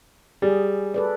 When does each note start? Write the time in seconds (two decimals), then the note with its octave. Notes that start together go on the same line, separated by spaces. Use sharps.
0.42 G3 G#4
0.94 A4 B4 D5